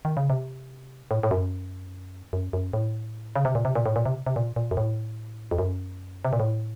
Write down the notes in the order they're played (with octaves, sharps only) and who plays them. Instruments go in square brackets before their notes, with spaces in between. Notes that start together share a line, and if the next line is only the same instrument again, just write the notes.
[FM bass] D#3
C#3
C3
A2
A2
F#2
F#2
F#2
A2
C#3
C3
A#2
C3
A#2
A2
A#2
C3
C3
A#2
A#2
F#2
A2
F2
F#2
C3
A#2
A2